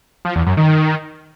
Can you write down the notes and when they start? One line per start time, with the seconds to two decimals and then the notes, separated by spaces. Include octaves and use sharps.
0.25 F3
0.36 E2
0.46 F#2
0.57 D#3